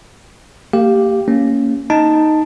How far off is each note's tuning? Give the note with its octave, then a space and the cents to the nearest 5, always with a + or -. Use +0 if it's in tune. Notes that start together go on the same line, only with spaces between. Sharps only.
A#3 -40 G4 +0 F5 +0
A#3 -10 C#4 +0
D#4 +0 A5 +5